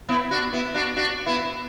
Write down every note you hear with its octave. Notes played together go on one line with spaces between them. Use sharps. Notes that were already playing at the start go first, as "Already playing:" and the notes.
B3 E4
D4 F#4
B3 E4
D4 F#4
D4 F#4
B3 E4